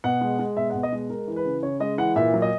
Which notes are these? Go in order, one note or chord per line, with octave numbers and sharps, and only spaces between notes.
B2 F#5
G#3
G#3
B2 E5
F#5
B2
D#5
G#3
G#3 A#4
E3
B4
C#3
C#3 C#5
G#3 D#5
E3 F#5
A#2 E5
F#3
D#5